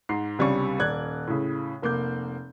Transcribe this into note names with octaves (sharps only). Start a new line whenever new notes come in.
G#2 C7
C#2 C3 G3 C#4 D4 C#6
D#1 D5 F#6 G#6
A2 C#3
F1 A#3 D6 G6